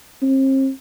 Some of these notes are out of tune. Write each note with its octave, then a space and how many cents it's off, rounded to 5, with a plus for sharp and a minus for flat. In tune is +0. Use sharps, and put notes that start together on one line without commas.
C4 +40